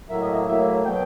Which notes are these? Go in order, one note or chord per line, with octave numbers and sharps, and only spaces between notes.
A2 F#3 A#3 E5
D#5
E5
A2 F#3 A#3 E5
B2 F#3 G5